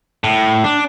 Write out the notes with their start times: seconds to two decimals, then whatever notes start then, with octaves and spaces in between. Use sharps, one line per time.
0.24 A2
0.64 D4